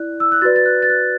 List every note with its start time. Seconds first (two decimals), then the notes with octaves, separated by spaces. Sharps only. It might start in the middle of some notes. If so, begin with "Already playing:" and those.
Already playing: E4 D5 F#6
0.20 E6
0.32 F#6
0.42 F#4 B4 D5 A6
0.56 A6
0.66 F#6
0.82 A6
0.90 F#6